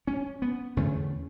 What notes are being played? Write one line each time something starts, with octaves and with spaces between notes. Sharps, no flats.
C#4
B3
E2 D3 A3 C#4